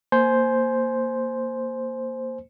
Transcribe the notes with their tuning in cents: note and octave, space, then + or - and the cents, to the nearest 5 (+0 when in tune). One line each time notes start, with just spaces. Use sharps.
A#3 -5 C5 +0 G#5 +20